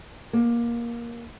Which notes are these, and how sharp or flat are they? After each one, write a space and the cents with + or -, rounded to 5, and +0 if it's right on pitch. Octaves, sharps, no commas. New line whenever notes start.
A#3 +15